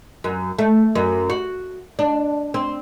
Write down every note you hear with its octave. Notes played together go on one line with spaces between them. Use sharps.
F#2
A3
F#2
F#4
D4
C4